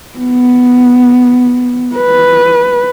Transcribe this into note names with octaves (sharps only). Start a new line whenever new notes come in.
B3
B4